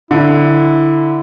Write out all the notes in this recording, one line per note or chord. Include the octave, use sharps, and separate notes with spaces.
D3 E4